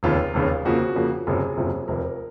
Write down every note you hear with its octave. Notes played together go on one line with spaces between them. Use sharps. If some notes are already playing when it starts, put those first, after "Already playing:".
F1 D#2 C#3 F4
F1 D#2 C#3
F2 C#3 F3 A#3 F#4
F2 C#3 F3 A#3
F#1 F2 C3 F#3 G#4
F#1 F2 C3 F#3
F1 F2 C3 A#4